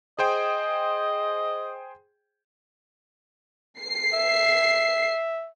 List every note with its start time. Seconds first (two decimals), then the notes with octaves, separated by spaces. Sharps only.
0.19 G#4 C5 D#5 G5
3.81 C7
4.14 E5